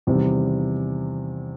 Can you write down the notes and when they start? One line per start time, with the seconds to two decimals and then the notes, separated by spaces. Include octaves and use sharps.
0.07 E2 C3 D#3 G3 C4